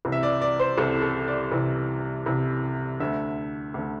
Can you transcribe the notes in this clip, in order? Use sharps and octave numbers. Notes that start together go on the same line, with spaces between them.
C2 C3 E3
E5
D5
D5
C5
C2 C3 E3 A4
A4
D5
C2 C3 E3
C2 C3 E3
D2 D3 E5
D2 D3